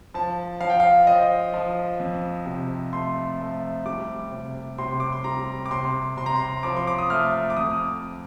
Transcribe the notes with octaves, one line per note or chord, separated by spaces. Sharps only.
F3 A5
F3 F5
G5
F5
F3 D#5
F3
F2
C3
A3 C6
A3
G3 D6
C3
C3 C6
D6
C6
G3 A#5
D6
C3 C6
C3 C6
A#5
C6
F3 D6
C6
D6
D#6
A3 F6
D6
F2 D#6